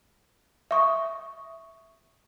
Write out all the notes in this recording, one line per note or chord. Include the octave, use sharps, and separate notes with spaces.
E5 C#6 D#6